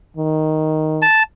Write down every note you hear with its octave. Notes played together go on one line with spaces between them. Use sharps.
D#3
A5